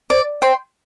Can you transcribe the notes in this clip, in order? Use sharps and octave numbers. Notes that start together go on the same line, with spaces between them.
C5 D5
C5 G5 C6